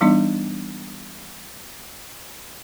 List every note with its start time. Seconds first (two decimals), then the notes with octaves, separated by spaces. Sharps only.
0.01 E3 G3 B3 D4 D#4 D#5